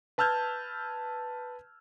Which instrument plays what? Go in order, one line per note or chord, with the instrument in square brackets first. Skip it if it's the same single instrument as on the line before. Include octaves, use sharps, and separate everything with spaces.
[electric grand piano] B4 A5 E6 F6 G6 G#6